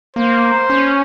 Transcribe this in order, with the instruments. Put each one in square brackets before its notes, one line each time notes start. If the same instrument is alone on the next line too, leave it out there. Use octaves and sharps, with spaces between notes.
[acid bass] A#3 [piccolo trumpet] C5
[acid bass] C#4